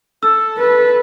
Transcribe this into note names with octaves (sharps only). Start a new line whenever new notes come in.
A4 E6
B4